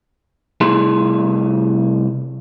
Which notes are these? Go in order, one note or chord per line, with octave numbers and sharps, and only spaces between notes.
C2 A3 E4 G#4 A5 C6